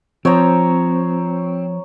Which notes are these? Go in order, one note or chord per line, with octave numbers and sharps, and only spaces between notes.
F3 C4 C#5 A#5